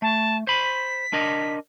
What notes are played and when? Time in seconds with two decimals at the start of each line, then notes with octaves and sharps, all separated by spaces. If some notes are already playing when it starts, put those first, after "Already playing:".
0.02 A3 A5
0.47 C5 B5 B6
1.13 D4 A#4 D#5